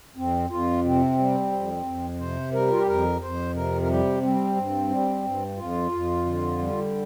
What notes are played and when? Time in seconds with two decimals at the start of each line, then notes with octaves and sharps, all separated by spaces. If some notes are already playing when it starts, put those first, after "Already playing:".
0.16 F2 C4
0.50 F2 F4
0.84 C3 C4
1.18 G3
1.52 F2
1.86 F2
2.19 C3 C5
2.53 G3 A#4
2.71 F4
2.79 G4
2.87 F2 A#4
3.21 F2 C5
3.54 C3 A#4
3.82 A#4
3.89 G3 G4
4.22 G3 C4
4.56 G2
4.90 G3
5.24 G2
5.58 F2 F4
5.91 F2
6.26 D3
6.59 G3